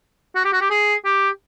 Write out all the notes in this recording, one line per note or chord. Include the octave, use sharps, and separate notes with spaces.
F#4
G4
F#4
G4
G#4
G4